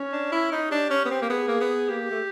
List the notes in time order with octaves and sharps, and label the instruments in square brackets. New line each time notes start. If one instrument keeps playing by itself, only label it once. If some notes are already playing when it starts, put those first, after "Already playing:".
Already playing: [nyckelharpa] C#4
[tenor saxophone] D4
E4
D#4
[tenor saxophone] D4 [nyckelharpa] G4
[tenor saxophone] C#4
B3
C4
A#3
[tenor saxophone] B3 [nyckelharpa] G#4
[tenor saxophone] A#3
B3
[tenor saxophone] A#3 [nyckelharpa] G4
[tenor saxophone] A3